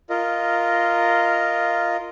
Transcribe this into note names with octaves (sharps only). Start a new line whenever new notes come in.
F4 A#4 D#5